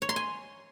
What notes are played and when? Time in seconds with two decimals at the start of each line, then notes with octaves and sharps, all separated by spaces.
0.02 C#5
0.09 C6
0.16 G#5